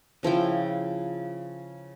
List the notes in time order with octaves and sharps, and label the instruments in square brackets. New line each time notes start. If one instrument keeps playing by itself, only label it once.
[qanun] C#3 F3 E4 G5